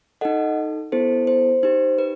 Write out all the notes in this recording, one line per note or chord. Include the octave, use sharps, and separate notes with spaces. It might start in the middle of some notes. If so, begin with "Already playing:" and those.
D#4 A4 D#5 F#5
B3 E4 A4 C5
C5
D#4 G4 C5
B4